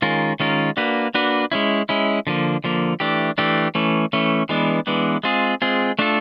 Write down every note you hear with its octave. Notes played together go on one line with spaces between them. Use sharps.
D#3 G#3 C#4 F4 A#4
D#3 G#3 C#4 F4 A#4
A#3 D4 F#4 B4
A#3 D4 F#4 B4
G#3 C#4 E4
G#3 C#4 E4
D3 F3 A#3
D3 F3 A#3
E3 A3 D4 G4
E3 A3 D4 G4
E3 A3 C#4
E3 A3 C#4
E3 G#3 B3 D4
E3 G#3 B3 D4
G#3 C4 F4 G#4
G#3 C4 F4 G#4
A3 D4 F4 A4